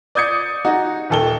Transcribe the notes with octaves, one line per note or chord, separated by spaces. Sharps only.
D5 D#6 G6 G#6 C#7
D#4 F#4
D#1 D#3 A4 G5 G7